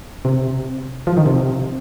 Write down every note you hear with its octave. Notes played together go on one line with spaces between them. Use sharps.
C3
F3
D#3
C3